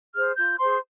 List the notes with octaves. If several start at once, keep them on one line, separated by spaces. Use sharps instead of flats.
G#4 C5 F6
F4 G6
G#4 C5 C6